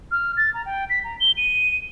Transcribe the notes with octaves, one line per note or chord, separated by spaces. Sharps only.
F6
A6
A#5
G5
B6
A#5
G7
D#7